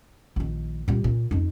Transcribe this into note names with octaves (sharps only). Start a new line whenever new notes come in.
A#1 D#3
A#2 G3
A#2
F2 D#4